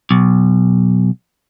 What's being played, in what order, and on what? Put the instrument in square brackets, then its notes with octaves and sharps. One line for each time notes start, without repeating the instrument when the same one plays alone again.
[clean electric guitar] B1